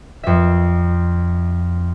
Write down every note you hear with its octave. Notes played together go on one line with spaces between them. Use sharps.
F2 E5